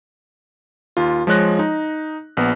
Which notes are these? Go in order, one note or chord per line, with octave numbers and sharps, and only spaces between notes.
D#2 F4
F3 G#3 C#5 F#6 A#6
D#4
A#1 B3